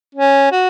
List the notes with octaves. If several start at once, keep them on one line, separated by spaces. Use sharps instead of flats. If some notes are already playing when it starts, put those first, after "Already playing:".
C#4
F#4